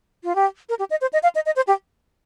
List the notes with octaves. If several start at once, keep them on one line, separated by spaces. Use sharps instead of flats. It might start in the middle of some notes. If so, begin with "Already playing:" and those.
F4
G4
A#4
G4
D#5
C5
D#5
F5
D#5
D#5
C5
G4